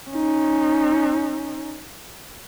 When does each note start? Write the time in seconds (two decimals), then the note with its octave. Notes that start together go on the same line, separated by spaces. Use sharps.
0.10 C#4 D#4